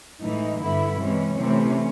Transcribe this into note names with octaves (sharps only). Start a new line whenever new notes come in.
A2 E3 G#3 D#4
G2 D3 G3 B3 E4
C3 E3 G#3 C#4
C3 E3 A3 C4